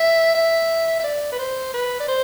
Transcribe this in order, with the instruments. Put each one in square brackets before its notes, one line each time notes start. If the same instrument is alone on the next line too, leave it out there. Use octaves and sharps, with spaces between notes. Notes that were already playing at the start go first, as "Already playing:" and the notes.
Already playing: [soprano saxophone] E5
E5
E5
D5
B4
C5
B4
D5
C5